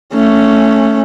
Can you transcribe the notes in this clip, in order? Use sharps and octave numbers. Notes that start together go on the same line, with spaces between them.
A3 C#4